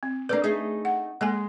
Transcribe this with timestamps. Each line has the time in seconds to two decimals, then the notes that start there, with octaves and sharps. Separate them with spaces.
0.03 C4
0.29 A#3 D4 A4 B4 D5
0.44 A3 D#4 G#4
0.85 F#5
1.21 G#3 A#3 A4 G#5